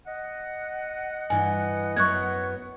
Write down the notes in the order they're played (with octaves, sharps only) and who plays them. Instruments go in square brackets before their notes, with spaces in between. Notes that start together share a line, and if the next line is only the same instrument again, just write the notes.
[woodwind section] D#5 F#5
[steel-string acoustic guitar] G2 E3 [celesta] G#5
[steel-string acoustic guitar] F#2 B3 C#5 [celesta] C#6 F#6 G#6